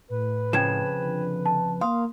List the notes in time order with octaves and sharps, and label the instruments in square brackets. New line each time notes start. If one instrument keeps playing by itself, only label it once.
[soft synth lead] A2 [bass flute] B4
[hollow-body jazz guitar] F2 C#3 F3 [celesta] G5 G#6 E7
[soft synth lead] D3
[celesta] A5
[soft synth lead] A#3 [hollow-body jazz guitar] F5 [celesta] C6 D#6